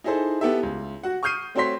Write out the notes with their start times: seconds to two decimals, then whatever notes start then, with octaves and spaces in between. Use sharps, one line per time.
0.04 D#4 E4 G#4 A4 C5
0.41 B3 E4 G4 A4 E5
0.63 C#2
1.03 F#4 F#5
1.23 C#6 D#6 F6 G6 C7 D#7
1.55 A3 C4 F#4 C#5 C6 B6